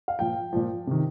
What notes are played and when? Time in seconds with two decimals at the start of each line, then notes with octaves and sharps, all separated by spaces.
0.08 F5
0.19 A#2 F3 G5
0.53 A#2 F3
0.87 C3 D#3